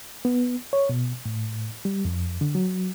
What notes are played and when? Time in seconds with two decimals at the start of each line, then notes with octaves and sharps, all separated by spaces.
0.25 B3
0.73 C#5
0.89 B2
1.26 A2
1.85 G3
2.05 F2
2.41 D3
2.55 F#3